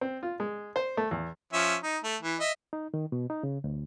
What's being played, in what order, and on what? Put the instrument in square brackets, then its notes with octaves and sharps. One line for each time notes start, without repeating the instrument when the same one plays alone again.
[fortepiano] C4
F4
G#3
C5
A3
E2
[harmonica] F3 C#4 E5
D#4
A3
E3
D#5 E5
[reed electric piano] D#4
D#3
B2
D#4
C#3
D2